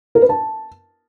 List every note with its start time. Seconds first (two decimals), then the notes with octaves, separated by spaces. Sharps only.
0.15 A#4
0.22 B4
0.29 A5